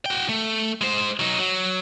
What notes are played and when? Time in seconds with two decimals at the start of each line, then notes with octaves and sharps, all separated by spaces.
0.06 F#4 G5
0.29 A3
0.81 G#3 C5
1.20 F#3 D#4
1.38 F#3